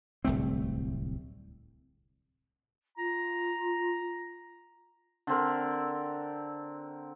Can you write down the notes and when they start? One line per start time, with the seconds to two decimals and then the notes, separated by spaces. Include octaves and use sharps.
0.25 D1 C2 A3 C4
2.98 F4 A#5
5.27 D3 C4 A#4